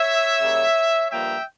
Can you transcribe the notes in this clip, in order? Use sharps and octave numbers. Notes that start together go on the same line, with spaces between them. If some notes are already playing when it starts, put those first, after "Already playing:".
Already playing: C#5 E5
C#3 G3 A#3
G2 F3 A#3 E5 G5